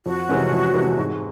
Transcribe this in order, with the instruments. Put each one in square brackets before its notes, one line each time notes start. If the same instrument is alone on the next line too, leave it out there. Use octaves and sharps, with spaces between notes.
[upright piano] F2 [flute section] F#4
[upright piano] C3 E3 G#3 C#4
F2
C3 E3 G#3 C#4
G#2